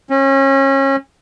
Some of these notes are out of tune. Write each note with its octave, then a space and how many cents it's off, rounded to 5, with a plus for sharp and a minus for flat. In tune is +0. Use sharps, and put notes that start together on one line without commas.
C#4 -30